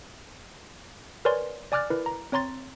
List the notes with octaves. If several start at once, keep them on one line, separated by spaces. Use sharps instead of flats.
A#4 B4 C#5 D5 G#5 C6
D5 G#5 D6 F6 F#6 A6
E4 A#4 B4
A#5
C4 C#5 A#5 C6 A6